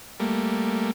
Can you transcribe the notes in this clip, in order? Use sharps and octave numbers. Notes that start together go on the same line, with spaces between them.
G3 A3 A#3